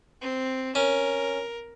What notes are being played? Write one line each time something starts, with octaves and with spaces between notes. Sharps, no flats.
C4
C#4 A#4